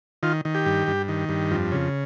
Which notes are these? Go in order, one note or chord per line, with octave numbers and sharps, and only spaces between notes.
D#3 F4
D#3
G4
G2
G2
D#3
G2
F2
C#3